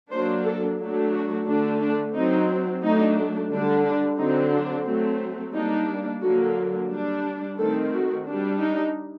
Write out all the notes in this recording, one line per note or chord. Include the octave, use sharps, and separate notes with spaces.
F#3 A#3 D4 C5
A4
F#3 A3 D4
F#4
D3 A3 D4
D4
F#3 C4 D#4
F#3 A3 D4 D#4
D3 G3 D4
D4
D3 F#3 C4 D#4
D4
F#3 A3 C4
G3 A#3 D4 D#4
D3 F#3 A#3 F#4
G3 D4
D#3 A3 C4 A4
F#4
G3 D4
D#4